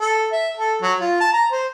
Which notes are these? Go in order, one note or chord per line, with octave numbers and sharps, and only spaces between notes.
A4
E5
A4
F#3
F4
A5
A#5
C5